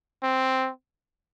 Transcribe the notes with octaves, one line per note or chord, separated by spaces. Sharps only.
C4